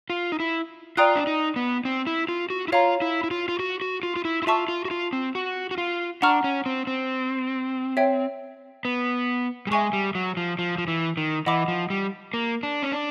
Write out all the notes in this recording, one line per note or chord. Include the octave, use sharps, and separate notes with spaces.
F4
D#4
E4
F4 D5 G5 A#5 D#6 F#6
D4
D#4
B3
C4
E4
F4
F#4
E4
F4 C#5 F5 A#5
E4
E4
F4
F4
F#4
F#4
F4
F4
E4
E4
F4 E5 A5 C#6 E6
F4
F#4
F4
C4
F#4
F#4
F4
D4 F#5 A#5 C#6 F6
C#4
C4
C4
C#5 E5 G5
B3
G3
G#3 E5 G#5 C#6
G3
F#3
F3
F3
F3
E3
D#3
E3 D#5 F#5 B5 D6
F3
G3
A#3
D4
C#4
D4